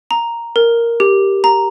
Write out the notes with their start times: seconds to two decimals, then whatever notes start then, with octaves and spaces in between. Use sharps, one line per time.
0.11 A#5
0.56 A#4
1.00 G4
1.44 A#5